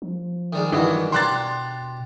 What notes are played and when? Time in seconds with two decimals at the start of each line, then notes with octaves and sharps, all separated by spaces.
0.02 F3
0.53 D#3 G3 G#3
0.72 G2 D#3 E3 F#3
1.12 B2 D4 G4 A#5 C6 F#6 A6